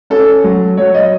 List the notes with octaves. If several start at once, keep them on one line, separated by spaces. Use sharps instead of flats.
C#4 A4
F#3
F#3 C#5
D#5